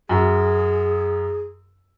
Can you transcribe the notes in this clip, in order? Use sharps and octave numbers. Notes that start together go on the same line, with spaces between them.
F#2 G#4